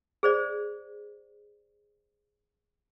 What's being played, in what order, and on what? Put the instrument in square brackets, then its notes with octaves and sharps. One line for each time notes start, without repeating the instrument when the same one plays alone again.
[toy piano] G#4 C5 D5